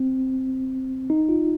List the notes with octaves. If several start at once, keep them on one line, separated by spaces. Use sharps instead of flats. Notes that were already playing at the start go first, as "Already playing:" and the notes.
Already playing: C4
D#4
F4